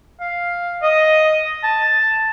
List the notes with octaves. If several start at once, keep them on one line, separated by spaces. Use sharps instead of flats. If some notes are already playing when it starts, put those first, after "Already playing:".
F5
D#5
A5